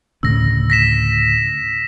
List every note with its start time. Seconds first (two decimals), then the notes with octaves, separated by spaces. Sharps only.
0.23 D2 A2 C#3 E6 A#6
0.70 A#6 B6 E7